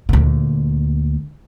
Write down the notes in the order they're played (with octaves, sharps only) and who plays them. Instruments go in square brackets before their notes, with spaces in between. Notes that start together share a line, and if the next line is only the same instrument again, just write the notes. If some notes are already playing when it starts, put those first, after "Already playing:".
[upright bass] D2 A#2